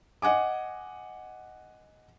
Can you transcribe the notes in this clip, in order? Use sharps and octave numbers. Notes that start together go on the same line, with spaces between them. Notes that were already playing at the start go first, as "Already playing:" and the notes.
D#5 F#5 G#5 D6